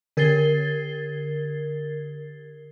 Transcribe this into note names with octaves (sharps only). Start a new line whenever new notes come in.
D3 A#4 G#6 A6 C7 G7